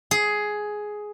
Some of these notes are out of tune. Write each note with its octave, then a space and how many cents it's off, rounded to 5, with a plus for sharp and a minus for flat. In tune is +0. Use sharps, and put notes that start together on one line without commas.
G#4 +10